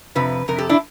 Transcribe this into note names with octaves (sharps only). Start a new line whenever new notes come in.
F2 C3 F3 B4
F2 C3 A#4
G4 A4
D4 E4